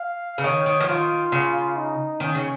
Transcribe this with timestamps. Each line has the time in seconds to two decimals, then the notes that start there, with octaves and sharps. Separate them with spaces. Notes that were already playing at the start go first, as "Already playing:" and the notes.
Already playing: F5
0.38 C#3
0.44 D#3 C#5
0.66 D#3
0.80 F3
0.89 D#3 F4
1.32 C#3
1.77 D#4
2.20 D#3 C#4
2.35 C#3